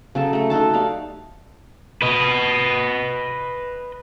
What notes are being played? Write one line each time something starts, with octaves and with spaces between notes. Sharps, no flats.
C#3 F#3 A4 A5
A3 A4
D#4 F#4 A4 A5
D#4 G4 D5 F5
B4 D#5